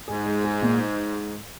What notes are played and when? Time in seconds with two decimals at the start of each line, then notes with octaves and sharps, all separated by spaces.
0.08 G#2 G#4
0.26 G#3
0.44 G#4
0.62 A#2